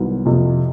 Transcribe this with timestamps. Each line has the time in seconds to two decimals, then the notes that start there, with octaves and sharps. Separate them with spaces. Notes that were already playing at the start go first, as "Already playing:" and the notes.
Already playing: C2 D#3 F#3 B3
0.26 F2 C3 F3